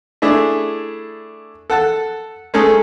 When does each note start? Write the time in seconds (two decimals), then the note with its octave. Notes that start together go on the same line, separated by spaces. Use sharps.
0.22 A3 D4 E4 G#4
1.70 A4 F#5 A5
2.54 G#3 A3 C#4 D#4 G#4 A4